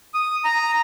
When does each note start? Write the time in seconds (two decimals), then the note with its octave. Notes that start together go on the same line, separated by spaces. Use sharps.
0.14 D#6
0.44 A#5